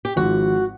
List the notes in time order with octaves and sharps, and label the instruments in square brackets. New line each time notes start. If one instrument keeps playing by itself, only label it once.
[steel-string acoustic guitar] G4
[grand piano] G#1 G#2 F3 [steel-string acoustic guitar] F#4